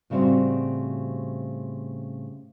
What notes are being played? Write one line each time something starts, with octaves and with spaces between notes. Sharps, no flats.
A2 C#3 G3 C4 F#4 C5